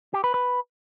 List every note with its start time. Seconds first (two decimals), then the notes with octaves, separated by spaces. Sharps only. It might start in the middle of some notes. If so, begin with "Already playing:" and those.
0.14 G4
0.24 B4
0.34 B4